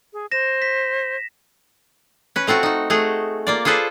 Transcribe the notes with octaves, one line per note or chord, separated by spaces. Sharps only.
G#4
C5 A#6 E7
B6
C#4 B4
A3 C4 F4 F#4
D#4 F#4
A3 F#4 G#4
A#3 F4 D5
F4 G#4 A4 B4 C5